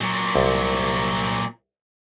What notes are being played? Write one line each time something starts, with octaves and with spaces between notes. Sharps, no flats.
A#2 F#3
C2